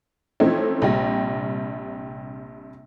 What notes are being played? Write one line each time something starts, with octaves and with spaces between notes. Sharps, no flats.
E3 F3 A3 C4 C#4 D#4
A#1 C3 G3 G4 A#6